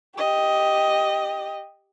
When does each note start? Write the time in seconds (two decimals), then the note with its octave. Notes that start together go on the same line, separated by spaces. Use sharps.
0.16 G4 D#5